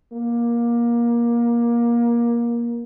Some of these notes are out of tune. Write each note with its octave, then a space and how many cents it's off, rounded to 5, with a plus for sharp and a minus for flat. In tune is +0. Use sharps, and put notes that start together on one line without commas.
A#3 +20